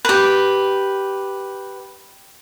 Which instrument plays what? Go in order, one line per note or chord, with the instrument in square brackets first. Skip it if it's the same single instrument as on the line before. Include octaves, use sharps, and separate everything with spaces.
[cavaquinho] G4 B4